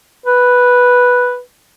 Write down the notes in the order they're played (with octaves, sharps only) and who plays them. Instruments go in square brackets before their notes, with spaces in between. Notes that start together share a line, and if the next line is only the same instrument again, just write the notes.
[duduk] B4